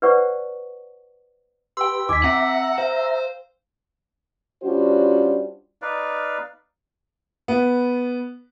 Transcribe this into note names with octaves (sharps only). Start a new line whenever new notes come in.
B4 C5 D5 F#5 C#6
G4 B4 G5 C6 E6
D#2 D#4 G#5 D6 B6
C4 E5 F#5 A#5
C5 F5
G3 C#4 D4 F4 F#4 C5
D#4 B4 D5 F5
B3